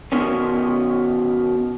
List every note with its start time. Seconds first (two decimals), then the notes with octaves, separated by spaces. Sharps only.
0.12 B2 D#3 B3 C#4